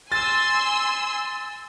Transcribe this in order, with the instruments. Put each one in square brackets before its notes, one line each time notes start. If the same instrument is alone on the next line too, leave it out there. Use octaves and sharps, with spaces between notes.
[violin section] G#5 C6 E6 [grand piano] A6